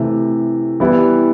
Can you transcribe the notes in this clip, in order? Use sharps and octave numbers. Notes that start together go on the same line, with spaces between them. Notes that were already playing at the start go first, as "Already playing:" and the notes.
Already playing: C3 E3 A3
E3 G3 B3 E4